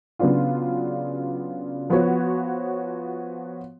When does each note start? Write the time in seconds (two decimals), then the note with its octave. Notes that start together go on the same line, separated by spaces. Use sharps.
0.19 C#3 F#3 B3 D4 F4
1.90 F3 B3 F#4 C#5